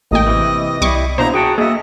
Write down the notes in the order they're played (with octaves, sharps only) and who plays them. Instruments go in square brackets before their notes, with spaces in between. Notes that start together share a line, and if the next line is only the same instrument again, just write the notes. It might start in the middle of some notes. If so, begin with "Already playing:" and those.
[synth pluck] A1 A#3 G5 [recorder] D#5
[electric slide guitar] C3 E3
[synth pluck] C2 C#6 D6 [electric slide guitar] G3 E4
[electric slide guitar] B2 A#3 E4 [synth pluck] D4 C5 [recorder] A#5
[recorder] F#4 [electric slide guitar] G#4 G5 A5
[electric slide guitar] A#3 E5 [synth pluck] G#4 [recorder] D#5